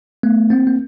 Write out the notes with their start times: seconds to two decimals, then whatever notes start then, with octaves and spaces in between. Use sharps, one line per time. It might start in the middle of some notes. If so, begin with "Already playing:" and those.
0.23 A3 B3
0.50 A#3 C4
0.67 A#3